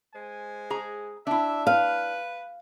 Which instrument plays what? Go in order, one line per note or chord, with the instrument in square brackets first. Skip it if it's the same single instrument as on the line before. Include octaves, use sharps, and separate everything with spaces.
[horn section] G#3 C5 G#5
[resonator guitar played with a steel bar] G#4 A#5
[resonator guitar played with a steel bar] D4 E4 [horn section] E5
[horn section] B4 [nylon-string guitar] F5